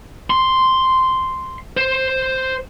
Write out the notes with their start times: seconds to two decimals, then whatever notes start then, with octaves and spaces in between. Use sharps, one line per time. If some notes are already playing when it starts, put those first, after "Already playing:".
0.30 C6
1.77 C5